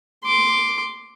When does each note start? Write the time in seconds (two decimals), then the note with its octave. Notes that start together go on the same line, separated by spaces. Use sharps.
0.24 C6 D6